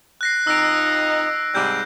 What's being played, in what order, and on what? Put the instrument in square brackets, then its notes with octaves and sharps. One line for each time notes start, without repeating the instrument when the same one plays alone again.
[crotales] F#6 A#6 C7
[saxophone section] F2 D#4 [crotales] E6 A#6 D7
[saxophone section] G#2 C3 G3 [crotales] G6